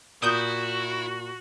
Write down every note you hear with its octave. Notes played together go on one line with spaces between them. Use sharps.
A#2 E4 F#4 D#6 G6